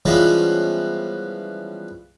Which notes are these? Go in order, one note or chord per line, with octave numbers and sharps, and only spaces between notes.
E3 F3 G3 G#3 B3 C#4